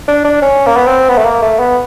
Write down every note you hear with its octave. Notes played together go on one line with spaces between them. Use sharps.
D4
D4
C#4
A#3
B3
C4
B3
A3
A#3
A3
B3